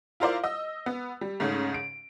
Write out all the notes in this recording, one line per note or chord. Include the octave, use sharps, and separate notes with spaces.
E4 F4 A#4 C5 D5 F5
D#5 E6
B3
G3
G#2 C#3 A3 C#4
D7